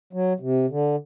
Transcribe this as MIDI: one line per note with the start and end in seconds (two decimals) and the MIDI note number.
0.13 0.33 54
0.40 0.66 48
0.70 0.96 50